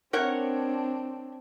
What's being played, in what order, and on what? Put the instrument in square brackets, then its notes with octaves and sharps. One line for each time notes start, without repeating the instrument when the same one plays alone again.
[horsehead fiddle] C4 D4 [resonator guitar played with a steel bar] A#4 C#5 F#5